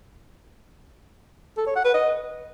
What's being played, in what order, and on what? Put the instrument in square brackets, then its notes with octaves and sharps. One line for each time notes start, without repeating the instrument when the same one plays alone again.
[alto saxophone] A4
C#5
F#5
B4
D#5